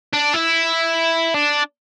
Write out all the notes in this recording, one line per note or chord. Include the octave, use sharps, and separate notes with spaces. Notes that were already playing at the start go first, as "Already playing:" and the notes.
D4
E4
D4